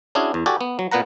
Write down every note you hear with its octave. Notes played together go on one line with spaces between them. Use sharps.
C#4 D4 E4 F#4 G#4
E2
F#4 G4 A4 D5 G#5
B3
F#3
A#2 B3 B4 F#5 A#5